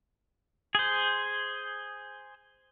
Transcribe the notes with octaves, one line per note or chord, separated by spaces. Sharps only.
G#4 C5